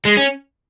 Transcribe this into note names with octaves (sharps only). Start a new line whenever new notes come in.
G#3
C#4